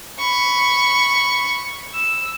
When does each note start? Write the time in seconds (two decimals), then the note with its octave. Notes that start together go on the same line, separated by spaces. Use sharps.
0.19 B5 C#6
1.94 E6